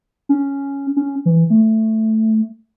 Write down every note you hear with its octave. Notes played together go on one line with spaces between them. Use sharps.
C#4
C#4
E3
A3